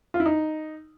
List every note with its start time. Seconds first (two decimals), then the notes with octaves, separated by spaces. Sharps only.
0.14 F4
0.20 E4
0.26 D#4